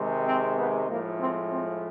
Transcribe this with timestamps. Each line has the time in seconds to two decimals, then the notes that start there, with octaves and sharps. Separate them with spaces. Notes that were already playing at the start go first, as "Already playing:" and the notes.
Already playing: C3 D#3 G#3
0.25 C4
0.56 B3
0.88 A2 F3 G#3 A#3
1.19 C4
1.51 C4